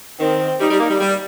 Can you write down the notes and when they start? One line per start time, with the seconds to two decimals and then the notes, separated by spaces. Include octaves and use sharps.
0.20 D#3 C4
0.60 G3 D#4
0.70 G3
0.80 A#3
0.90 G3
1.00 G3